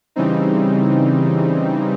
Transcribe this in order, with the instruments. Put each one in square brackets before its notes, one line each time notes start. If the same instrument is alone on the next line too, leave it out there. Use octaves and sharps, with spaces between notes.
[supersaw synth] C#3 E3 G3 C4 D#4